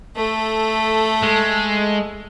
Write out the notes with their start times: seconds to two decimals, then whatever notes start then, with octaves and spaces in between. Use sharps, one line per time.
0.16 A3 A4
1.22 G#3